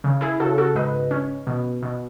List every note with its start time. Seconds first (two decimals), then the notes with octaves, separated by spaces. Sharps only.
0.04 C#3
0.21 E4 G#4
0.40 C#3 F#4 A4
0.58 F#4 A4
0.75 G#2 B4 D#5
1.11 C#4
1.47 B2
1.82 B2